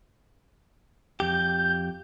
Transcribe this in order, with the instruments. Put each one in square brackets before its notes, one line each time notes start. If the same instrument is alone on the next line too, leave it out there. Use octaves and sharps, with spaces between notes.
[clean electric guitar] F2 G4 [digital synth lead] G6